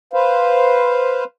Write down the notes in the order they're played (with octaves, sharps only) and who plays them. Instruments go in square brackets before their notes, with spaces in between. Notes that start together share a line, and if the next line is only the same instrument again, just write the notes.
[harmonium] B4 C5 F5